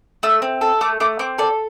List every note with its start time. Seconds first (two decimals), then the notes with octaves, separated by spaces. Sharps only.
0.23 A3 E6
0.42 C4
0.61 A4
0.81 A3 D6
1.00 A3 D6
1.19 C4 D6
1.38 A4 D5